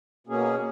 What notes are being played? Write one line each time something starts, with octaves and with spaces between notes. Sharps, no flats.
B2 A#3 C#4 G#4